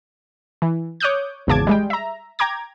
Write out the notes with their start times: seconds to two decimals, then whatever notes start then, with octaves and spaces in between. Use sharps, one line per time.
0.62 E3
1.00 C#5 D6 D#6 F#6 G6
1.47 G#1 E2 C#3 A5 D6 G#6
1.67 G3 G#3 G5
1.90 E5 A#5
2.39 G5 A#5 D6 G#6